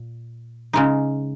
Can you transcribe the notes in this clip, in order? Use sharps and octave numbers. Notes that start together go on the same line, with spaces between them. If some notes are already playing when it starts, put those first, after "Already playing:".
Already playing: A#2
C#3 G#3 D#4